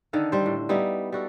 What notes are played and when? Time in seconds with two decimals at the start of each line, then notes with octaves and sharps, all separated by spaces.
0.13 D3 D#3 A4 F5
0.32 G3 C5
0.46 A2
0.69 G3 B3 D#4 E4
1.12 G3 F#4 A4